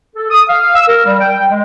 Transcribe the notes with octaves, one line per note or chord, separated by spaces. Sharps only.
A4
D#6
F5
E6
A#4
G3
G5
G#3